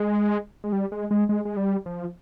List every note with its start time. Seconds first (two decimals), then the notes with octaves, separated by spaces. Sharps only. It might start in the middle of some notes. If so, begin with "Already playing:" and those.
Already playing: G#3
0.64 G#3
0.73 G3
0.92 G#3
1.11 G#3
1.29 G#3
1.45 G#3
1.57 G3
1.86 F3